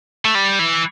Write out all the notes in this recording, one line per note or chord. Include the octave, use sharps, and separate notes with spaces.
A3
G3
E3